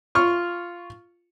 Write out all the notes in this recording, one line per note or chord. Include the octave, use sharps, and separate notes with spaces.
F4 C#6 F6